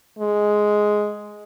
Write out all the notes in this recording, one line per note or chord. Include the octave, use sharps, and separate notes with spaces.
G#3